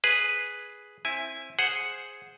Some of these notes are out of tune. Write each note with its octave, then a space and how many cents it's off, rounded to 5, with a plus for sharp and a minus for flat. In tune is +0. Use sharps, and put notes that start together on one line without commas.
G#4 +0 B4 +0
C4 +20 E4 +0 G#5 -5
G#4 +0 C5 +0 F#5 +0